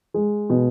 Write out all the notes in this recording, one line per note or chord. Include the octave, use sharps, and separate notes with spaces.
G#3
B2